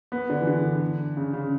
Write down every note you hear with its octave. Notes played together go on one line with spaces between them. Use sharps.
B3
D3
E3
D3
C#3
C#3